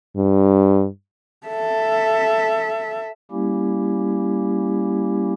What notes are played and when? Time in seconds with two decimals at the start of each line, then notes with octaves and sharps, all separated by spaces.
0.16 G2
1.47 A4 E5
3.31 G3 A#3 C#4 E4 G4